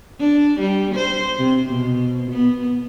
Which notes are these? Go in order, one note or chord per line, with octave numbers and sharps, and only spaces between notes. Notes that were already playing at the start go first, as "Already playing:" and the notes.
D4
G3
C5
C3
B2
B3